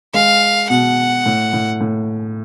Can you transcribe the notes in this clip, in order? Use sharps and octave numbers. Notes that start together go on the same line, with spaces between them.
G#3 F5
B2 F#5
A2
A2
A2